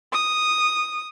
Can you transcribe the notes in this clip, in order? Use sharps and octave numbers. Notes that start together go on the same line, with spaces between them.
D#6